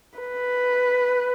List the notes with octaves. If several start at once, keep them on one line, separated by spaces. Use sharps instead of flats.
B4